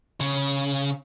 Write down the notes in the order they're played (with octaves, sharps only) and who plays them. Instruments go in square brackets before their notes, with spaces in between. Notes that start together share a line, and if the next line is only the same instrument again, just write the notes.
[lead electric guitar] C#3